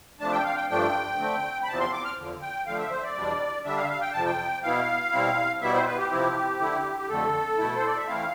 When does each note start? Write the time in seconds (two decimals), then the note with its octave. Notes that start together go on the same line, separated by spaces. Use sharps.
0.20 C3 F3 A3 D4 A5
0.32 G5
0.44 F5
0.56 G5
0.70 G2 F3 A3 D4 G5
1.19 D3 A3 C4
1.63 B5
1.68 E2 C3 F3 C4 A5
1.80 C6
1.93 D6
2.05 F6
2.17 E2 D3 F3
2.42 G5
2.66 D3 F3 A3 F5
2.79 E5
2.91 C5
2.98 E5
3.03 D5
3.16 E2 B2 G3 D4
3.65 D3 G3 D4 E5
3.77 F5
3.84 E5
3.90 F5
4.01 G5
4.13 F2 C3 F3 A5
4.25 G5
4.63 B2 B3 E4 F5
5.12 B2 G3 C4 E4
5.61 B2 G3 B3 E4 E5
5.74 C5
5.86 B4
5.98 G4
6.11 C3 F3 C4 E4
6.60 D3 A3 E4
6.98 G4
7.09 F2 D3 A3 A4
7.58 B2 A3 E4
7.76 C5
7.87 D5
7.97 E5
8.07 E3 A3 C4 E4 F5